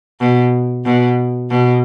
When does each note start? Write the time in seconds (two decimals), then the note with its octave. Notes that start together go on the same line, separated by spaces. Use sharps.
0.20 B2
0.85 B2
1.50 B2